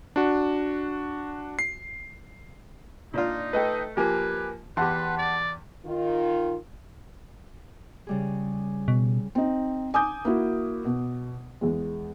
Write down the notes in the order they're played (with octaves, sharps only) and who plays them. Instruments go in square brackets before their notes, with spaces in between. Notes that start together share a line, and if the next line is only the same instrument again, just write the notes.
[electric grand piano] D4 F#4
C7
[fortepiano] A#2 D4 F4 [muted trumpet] D#4
[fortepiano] A3 A4 [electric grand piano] B4 D#5 G5
[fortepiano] F3 A#3 [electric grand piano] G4 G#5 [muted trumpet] B4
[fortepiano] E2 G4 [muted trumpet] B4 [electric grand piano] F#5 A5 C6
[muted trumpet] D5
[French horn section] D#3 F4
[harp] C#3 G3 G#4
[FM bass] B2
[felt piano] C4 D#4
G#5 D6 D#6 G6
A#3 E4 F#4
B2
E2 G#3